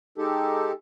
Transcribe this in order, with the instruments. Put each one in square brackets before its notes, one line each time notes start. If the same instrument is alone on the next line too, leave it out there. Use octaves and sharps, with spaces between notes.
[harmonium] G#3 D#4 G4 A4